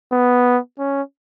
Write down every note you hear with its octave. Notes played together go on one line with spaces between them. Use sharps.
B3
C#4